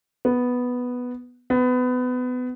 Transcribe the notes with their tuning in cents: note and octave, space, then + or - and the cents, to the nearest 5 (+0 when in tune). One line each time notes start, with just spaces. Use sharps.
B3 +0
B3 +25